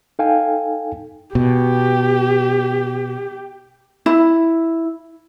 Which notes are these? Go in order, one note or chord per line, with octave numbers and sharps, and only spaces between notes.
D#4 A4 F5 G5 G#5
B2 G4
E4